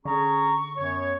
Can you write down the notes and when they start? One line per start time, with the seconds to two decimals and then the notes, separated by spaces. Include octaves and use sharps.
0.05 D3 C#4 G#4 A#5 C#6
0.77 F#2 B3 C#5